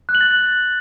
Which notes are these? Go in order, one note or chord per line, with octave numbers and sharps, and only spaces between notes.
F#6
F#7
A6